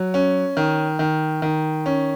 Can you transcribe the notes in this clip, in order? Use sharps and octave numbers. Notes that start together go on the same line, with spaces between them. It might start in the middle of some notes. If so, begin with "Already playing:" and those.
Already playing: F#3
C#4
D#3
D#3
D#3
C#4